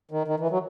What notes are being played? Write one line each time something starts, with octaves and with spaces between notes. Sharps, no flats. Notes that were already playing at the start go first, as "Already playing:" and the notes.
D#3
D#3
E3
F#3